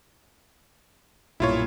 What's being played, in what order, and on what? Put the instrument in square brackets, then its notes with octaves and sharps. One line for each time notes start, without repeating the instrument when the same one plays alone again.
[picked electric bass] B1 G2 A#2 [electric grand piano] E4 F4 C#5